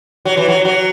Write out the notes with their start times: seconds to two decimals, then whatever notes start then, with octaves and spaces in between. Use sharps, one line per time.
0.25 F#3
0.37 E3
0.48 F#3
0.65 F#3